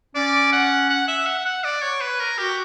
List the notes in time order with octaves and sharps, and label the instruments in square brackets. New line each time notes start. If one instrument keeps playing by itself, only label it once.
[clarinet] C#4 [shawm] D5
[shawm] F#5
F#5
E5
F#5
F#5
D5
C#5
B4
A#4
[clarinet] F#4 [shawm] G4